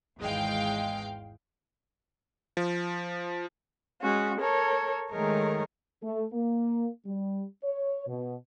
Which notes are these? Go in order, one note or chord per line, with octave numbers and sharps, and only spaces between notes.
G#1 E2 G#3 F5 G5
F3
G#3 C#4 F#4
A4 A#4 C#5
D#3 G#3 A3 G#4 A#4 C#5
A3
A#3
G3
C#5
B2